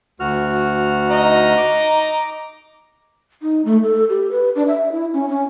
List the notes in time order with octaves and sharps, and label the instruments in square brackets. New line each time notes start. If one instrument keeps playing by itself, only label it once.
[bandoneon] D2 F#4 F6
[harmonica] D#5 A#5
[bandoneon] D6
[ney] D#4
A3
A4
G4
B4
D4
E5
E4
C#4
C#4